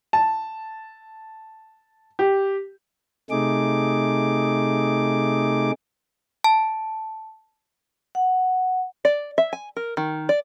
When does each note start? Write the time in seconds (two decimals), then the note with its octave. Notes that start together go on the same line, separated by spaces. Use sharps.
0.13 A5
2.19 G4
3.30 C3 A3 D#4 G#4 D6
6.44 A5
8.15 F#5
9.05 D5
9.38 E5
9.53 G#5
9.77 A#4
9.97 D#3
10.29 D5